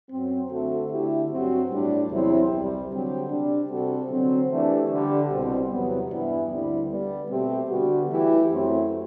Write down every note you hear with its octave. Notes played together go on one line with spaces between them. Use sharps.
F#2 F#3 C4
D3 A3 C4 F#4 A4
D3 A3 E4 G4
G2 F#3 C4 F#4
A2 G3 D4
E2 C3 F#3 C4 E4
C2 C3 G3
D3 F#3 C4 G4
C3 G3 D4
C3 G3 C4 F#4 A4
D3 F#3 C4
E3 A3 D4 G4
D3 G3 D4 G4
C2 B2 G3 C4
E2 C3 F#3 B3
G2 E3 G3 B3 E4
D2 D3 G3 C4 E4
D3 G3 B3
B2 A3 C4 G4
D3 G3 B3 F#4
E3 A3 E4 G4
F#2 F#3 A3 C4 E4